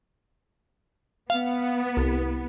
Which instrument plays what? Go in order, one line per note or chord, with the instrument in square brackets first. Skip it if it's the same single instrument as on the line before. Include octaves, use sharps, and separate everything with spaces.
[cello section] B3 [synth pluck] F5
[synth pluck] C2